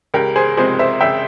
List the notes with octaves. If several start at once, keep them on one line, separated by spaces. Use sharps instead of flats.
C#2 G4 A#4
G#4 C5
C3 F3 G#3 C4 G#4 C5
C5 E5
C#2 E5 G5